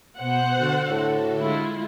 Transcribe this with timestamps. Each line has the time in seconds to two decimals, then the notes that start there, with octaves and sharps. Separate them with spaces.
0.19 B2 B3 C5 F#5
0.55 D3 F#4 A4
0.90 A2
1.41 G#3 E4 F4